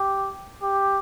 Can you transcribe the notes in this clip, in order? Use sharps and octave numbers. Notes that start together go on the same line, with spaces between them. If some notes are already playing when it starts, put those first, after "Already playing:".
Already playing: G4
G4